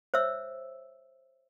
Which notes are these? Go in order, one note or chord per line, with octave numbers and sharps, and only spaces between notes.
C5 C#5 E5 E6